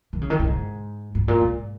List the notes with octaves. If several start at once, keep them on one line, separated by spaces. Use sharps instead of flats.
D#3
C#3
D#3
C#3
G#2
G#2
A#2
G#2